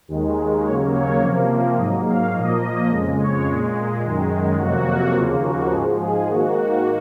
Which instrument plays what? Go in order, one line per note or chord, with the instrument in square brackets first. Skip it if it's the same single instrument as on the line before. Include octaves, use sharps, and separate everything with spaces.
[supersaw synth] D#2 D#3 G#3
D#2 C#3 F#3 A#3 C#5
C#5
C3 F3 A#3
G#2 F#3 A#3 D#5
F5
A#2 F3 A#3 D#5
F2 C#3 G#3
C#5
A#2 G#3
F#2 D#3 G#3
F2 C3 F#3 A#3 F#4
D#2 C#3 F3 A#3 F4
F#4
G#2 F3 G#3 G#4
G#4
G#2 D#3 A#3 F#4